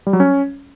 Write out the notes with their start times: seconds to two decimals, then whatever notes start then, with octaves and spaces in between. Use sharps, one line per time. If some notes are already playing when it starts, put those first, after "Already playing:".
0.07 G3
0.13 F#3
0.20 C#4